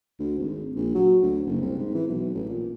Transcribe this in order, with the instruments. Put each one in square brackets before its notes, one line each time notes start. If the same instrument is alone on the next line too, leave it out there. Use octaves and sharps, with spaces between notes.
[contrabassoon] D2
G#1
A#1
F#3
D2
F#1
C2
G#2
E3
B1
A1
A#2